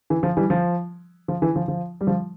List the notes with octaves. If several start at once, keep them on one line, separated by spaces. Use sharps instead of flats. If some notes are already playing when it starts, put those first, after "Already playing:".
E3
F3
E3 G3
F3
F3
E3
F3
F3
G3
F3